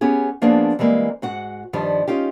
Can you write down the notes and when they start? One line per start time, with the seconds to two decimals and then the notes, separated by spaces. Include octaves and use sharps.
0.01 B3 C#4 G4 G#4
0.42 F3 A#3 B3 D4 G#4
0.79 E3 G3 G#3 A#3 C4
1.22 G#2 F#4 F#5
1.73 G2 D#3 F3 G3
2.08 C#4 D#4 F4 G4